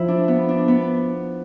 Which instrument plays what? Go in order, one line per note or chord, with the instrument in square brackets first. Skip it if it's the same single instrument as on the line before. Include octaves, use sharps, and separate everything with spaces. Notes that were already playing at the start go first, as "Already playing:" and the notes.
Already playing: [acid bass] F3 [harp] E4
[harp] D4
B3
D4
B3